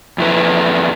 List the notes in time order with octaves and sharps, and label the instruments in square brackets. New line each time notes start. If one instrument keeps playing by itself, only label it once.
[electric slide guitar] F2 E4 B4